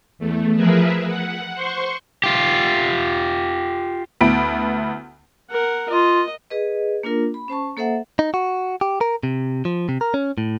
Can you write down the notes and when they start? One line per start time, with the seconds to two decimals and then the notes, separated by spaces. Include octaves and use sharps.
0.18 E2 A3
0.55 F3 G#4 A#4 B4 E5
1.07 F#5
1.54 C5 C6 C#6
2.24 F4 G4
4.21 D2 B3 E4 B5 D7
5.51 A#4 F#5
5.90 F4 D#5
6.50 G#4 B4 D#5
7.03 A#3 D4 F4 A#4
7.34 B5
7.48 C#4 C5 A5 C#6
7.77 A#3 A4 C5 E5 F#5
8.19 D#4
8.34 F#4
8.81 G4
9.01 A#4
9.23 C3
9.65 F3
9.89 C3
10.01 A#4
10.14 C#4
10.38 A2